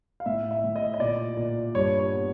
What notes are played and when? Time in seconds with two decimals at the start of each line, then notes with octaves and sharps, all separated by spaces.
0.20 F5
0.26 A2 E5
0.51 E5
0.64 A2
0.76 D#5
0.94 D#5
1.00 A#2 D5
1.37 A#2
1.75 G2 C#5
1.99 C#5
2.12 B3